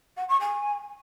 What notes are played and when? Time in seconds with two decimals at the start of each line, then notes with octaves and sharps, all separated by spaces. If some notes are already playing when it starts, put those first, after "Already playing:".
0.17 F#5
0.29 C#6
0.40 G#5